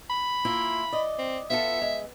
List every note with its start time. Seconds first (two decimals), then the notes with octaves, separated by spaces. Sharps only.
0.10 B5
0.45 A#3 E4 F4
0.92 D5 D#5
1.18 C4
1.50 B3 F4 A4 E5
1.82 G#3